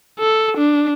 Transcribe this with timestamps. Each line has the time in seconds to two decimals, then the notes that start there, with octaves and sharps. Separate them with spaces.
0.19 A4
0.57 D4